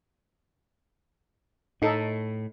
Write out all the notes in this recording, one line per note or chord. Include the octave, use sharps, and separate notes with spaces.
A2 D#4 A4